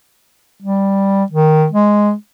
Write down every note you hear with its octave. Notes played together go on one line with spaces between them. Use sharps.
G3
D#3
G#3